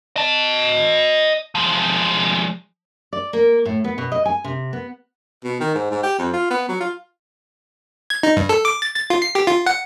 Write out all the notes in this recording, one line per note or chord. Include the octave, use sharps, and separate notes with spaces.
D#5 A5
F3 G#3
D5
A#3
A2
B3
B2
D#5
G#5
C3
B3
B2
D#3
G#2
G#2
G4
F2
F4
B3
F#3
F4
G#6
D#4
G2
A4
D6
A6
A6
F4
C7
G4
F4
F#5